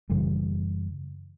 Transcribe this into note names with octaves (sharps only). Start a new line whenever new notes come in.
F#2 C#3 E3 G3